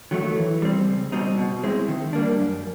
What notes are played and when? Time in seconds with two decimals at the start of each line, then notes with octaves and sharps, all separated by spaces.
0.11 D#3 F#3 A3
0.36 E3
0.62 G3 C4
0.87 C#2
1.12 B2 G3 C4 D#4
1.38 B2
1.64 G#3 C4 E4
1.88 D#3
2.13 G3 A#3 D4
2.39 F#2